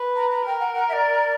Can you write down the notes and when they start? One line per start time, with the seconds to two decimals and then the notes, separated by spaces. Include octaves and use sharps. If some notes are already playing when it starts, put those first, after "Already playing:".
Already playing: B4
0.16 A#5
0.30 A#5
0.45 A#4 G5
0.60 F#5
0.74 F#5
0.89 E5
0.93 D5